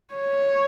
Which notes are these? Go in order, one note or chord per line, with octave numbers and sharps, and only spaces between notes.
C#5